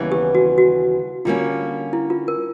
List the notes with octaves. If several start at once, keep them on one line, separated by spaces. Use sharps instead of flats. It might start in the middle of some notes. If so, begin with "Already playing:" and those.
Already playing: D#2 C#3 E3 G3 B3
G4
F#4
F#4
D3 G3 A#3 C#4 F4
E4
F4
A#4